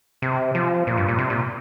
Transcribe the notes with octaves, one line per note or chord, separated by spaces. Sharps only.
C3
F3
A#2
G2
A#2
C3
A#2